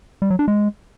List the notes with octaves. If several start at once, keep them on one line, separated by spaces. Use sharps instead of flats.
G3
F#3
D4
G#3